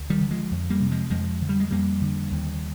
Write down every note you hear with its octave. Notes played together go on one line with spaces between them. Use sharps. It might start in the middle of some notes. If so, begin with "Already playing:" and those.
Already playing: D2
D#3 G3
D3
F3 G#3
F2
G3 A#3
C3
F3 G#3
F2 F3 G#3
D3
G3
G#3
F2 G3 A#3
D3
D#2